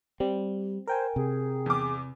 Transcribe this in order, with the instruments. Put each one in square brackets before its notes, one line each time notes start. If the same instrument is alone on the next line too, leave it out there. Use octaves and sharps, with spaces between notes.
[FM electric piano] G3 [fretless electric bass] C4
[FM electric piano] A#4 G5 G#5 [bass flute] C5
[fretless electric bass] C3 [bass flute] G#4
[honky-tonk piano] E2 D6